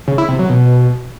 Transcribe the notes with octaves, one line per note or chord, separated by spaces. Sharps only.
C#3
E4
C3
F#3
B2